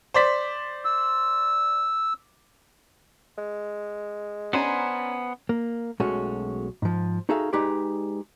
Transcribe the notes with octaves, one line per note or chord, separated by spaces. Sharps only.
C5 D5 B6
E6
G#3
B3 C#4 D4 C5 G#5 A#5
A#3
B1 G#3 A3 C#4 F#4
G#2 F3
D#4 F#4 G#4 A4 E5 F5
G#3 D#4 G4 G#4 B4 D5